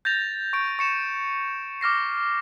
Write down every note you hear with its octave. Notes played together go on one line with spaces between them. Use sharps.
G6 A6 A#6 F7
C#6 D7
C#6 C#7 E7
D6 F6 A#6 C7